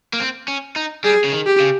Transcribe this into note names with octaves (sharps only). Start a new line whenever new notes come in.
A#3
C4
C#4
D#4
G3 G#4
C#3
D#3
G4
C#3